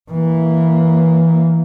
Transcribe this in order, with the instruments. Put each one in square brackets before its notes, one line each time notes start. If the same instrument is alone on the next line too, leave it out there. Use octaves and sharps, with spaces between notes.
[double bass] E3 A#3